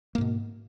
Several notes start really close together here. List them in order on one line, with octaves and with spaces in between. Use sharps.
A#3 G#2 B2